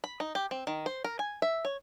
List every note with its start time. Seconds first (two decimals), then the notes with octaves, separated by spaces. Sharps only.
0.04 B5
0.20 D#4
0.35 G4
0.51 C4
0.67 D#3
0.86 C5
1.04 A#4
1.19 G#5
1.42 E5
1.65 C#5